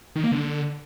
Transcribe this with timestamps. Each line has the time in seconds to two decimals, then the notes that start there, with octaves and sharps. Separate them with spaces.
0.16 D#3
0.24 A#3
0.32 D3